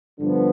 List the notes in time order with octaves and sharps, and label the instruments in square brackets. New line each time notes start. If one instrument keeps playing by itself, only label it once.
[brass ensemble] G2 D3 F3 B3